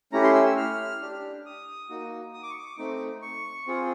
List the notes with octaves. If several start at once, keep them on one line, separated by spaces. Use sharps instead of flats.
A3 C#4 E4 G4 A#5
C6
E6
E6
F6
D4 G4
D#6
A#3 D#4 F#4
D#6
D6
C#6
D6
A3 C4 D#4
C#6
C4 F4 G#4